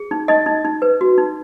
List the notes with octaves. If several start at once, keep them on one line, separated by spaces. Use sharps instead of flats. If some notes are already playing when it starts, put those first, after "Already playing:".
Already playing: G#4
D#4
D#4 D#5
D#4
D#4
B4
F#4
D#4